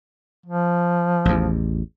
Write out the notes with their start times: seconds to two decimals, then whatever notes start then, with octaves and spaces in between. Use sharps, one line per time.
0.46 F3
1.25 A1 E2